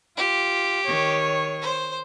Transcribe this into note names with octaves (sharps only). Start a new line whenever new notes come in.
F4 G4
D#3 C#5
C5